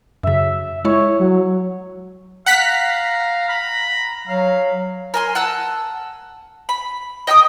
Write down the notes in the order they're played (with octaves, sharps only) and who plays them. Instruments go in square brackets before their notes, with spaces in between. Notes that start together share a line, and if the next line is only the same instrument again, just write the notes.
[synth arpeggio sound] F#2 C#3 [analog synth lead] E5
[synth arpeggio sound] G#3 E4 [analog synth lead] C#5
[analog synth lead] F#3
[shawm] F5 [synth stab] F#5 F#6 B6 [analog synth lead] A#5
[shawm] B5
[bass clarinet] F#3 [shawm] F5
[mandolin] A#4 G#5 C6
F#5 A5 E6
B5
D#5 G5 C6 D#6